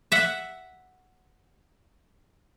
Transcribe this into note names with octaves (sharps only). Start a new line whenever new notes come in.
E5 F#5